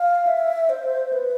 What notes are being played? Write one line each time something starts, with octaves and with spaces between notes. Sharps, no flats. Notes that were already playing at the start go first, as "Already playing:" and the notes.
Already playing: F5
E5
C5
B4